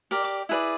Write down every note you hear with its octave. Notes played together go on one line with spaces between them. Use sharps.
G4 A#4 D5
D6
E4 G#4 B4 D5